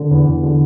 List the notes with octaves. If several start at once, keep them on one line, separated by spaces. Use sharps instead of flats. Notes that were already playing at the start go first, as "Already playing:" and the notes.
Already playing: D3
E2
E2
D3